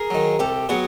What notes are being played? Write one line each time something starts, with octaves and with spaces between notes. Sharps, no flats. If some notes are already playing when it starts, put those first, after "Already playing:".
Already playing: G#4 A#4
D#3 F#3
C2 G4 A4
F#3 B3 F#4 G#4